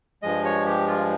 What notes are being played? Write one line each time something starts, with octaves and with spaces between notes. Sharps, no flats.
G2 F3 G#3 D#5
C#5
G4
F4